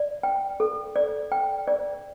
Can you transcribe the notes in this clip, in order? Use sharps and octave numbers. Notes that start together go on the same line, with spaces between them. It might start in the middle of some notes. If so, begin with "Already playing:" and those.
Already playing: D5
G5
A4
D5
G5
D5